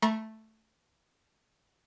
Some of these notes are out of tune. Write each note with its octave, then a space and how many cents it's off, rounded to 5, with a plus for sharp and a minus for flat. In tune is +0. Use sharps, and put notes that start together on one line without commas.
A3 +0 A#5 +40 C#6 -35